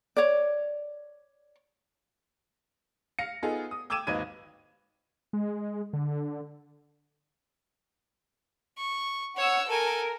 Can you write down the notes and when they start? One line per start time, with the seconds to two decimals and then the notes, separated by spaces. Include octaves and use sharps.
0.17 C#5 D5
3.19 F5 A#6 C#7
3.42 B3 D#4 F4 G#4 A4
3.71 D#6
3.90 G5 D6 E6 G#6 D#7 E7
4.07 G#1 D#2 D#4 B4 G#6 D#7
5.33 G#3
5.93 D3
8.78 C#6
9.37 C#5 F#5 E6
9.68 A4 A#4 G#5